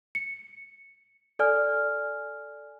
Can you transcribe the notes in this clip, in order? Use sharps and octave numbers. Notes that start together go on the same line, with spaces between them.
C#7
A4 D5 G#5 F6